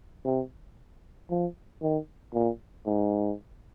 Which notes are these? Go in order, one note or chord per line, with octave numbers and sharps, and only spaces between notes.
C3
F3
D#3
A#2
G#2